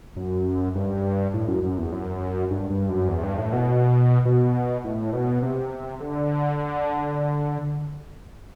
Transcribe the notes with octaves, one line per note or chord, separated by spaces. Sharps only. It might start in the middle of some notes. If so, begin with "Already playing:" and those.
F#2
G2
A2
F#2
F#2
E2
F#2
G2
G2
F#2
E2
G2
A2
B2
B2
A2
B2
C3
D3